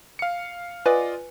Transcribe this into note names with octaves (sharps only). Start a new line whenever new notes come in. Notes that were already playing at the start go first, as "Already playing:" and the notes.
F5 C#7
F4 B4 D5 D#5 G#5